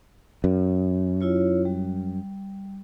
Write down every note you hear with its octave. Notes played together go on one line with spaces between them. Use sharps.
F#2
E4 F4 C#5
G3